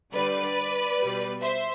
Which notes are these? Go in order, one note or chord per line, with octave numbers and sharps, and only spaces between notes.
D3 G3 B4 D5
B2 G3
C5 E5